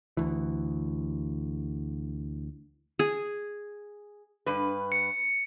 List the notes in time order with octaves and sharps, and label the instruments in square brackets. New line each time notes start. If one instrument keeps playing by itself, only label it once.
[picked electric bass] D2 E3
[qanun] G#4
[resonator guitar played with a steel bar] G2 B4
[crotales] C#7